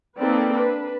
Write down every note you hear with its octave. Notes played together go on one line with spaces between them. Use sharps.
A#3 C4 D#4 A4 B4 D5
D4 B4